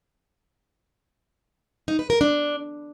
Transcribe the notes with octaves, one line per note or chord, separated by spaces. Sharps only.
D#4
B4
A#4
D4